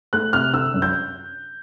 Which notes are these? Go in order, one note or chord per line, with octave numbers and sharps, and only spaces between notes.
A3 F#6
C3 F6
D3 E6
F#2
G6